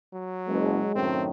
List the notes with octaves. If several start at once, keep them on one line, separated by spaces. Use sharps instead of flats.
F#3
F#1 B2 G#3
F#2 A2 D#3 C4